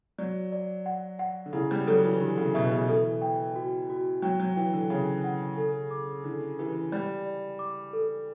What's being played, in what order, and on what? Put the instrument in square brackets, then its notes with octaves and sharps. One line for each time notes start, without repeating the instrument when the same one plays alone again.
[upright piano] F#3 [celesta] D5
[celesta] D5
F#5
F#5
[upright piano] D3
[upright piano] C#3 [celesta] E4
[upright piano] G3
[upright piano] F#3 [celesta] A4
[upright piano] E3
[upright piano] D3 [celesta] G4
[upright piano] C#3
[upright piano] B2 [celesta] E5
[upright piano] C#3
[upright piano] E3 [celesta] A4
[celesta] G5
F#4
F#4
[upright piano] F#3 [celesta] G5
[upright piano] F#3
[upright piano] E3 [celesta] G5
[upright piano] D3
[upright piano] C#3 [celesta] C#5
[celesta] F#5
A4
D6
[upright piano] D3 [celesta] E4
[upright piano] E3 [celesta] G4
[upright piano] G3 [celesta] D5
[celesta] D5
D6
A4